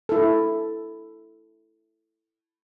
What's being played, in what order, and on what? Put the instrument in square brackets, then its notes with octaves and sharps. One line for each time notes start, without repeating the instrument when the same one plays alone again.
[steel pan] E4 A4